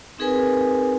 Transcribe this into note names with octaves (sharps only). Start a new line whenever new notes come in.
C4 D#4 G#4 A#4 B4 G#5